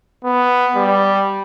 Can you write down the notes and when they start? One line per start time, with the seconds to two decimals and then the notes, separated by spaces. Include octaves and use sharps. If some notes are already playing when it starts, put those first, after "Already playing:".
0.24 B3
0.76 G3